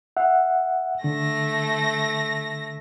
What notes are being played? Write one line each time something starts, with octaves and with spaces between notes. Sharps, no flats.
E5 F#5
D3 A3 A#6